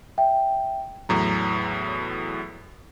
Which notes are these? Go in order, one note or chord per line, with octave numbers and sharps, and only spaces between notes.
E5 G5
E2 A2 F#3 A#5